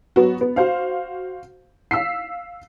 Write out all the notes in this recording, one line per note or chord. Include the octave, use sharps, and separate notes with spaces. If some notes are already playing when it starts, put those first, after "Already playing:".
F#3 B3 F#4
B3
F#4 C5 F5
F5 E6 B6 C7